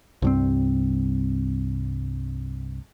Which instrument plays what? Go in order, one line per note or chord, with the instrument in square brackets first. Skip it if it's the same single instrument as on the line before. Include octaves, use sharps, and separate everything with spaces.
[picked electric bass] C2 G2 C4